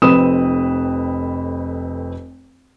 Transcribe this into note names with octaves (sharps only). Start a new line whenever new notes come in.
F1 F2 C4 B4 D#6 E7